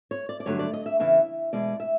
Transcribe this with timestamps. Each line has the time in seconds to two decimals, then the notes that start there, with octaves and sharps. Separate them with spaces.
0.11 C#5
0.29 D5
0.40 D5
0.46 G2 D3 F#3 A3 C#5
0.59 D5
0.74 D#5
0.86 E5
0.99 E2 C#3 E3 E5
1.53 E2 B2 G#3 D5
1.80 E5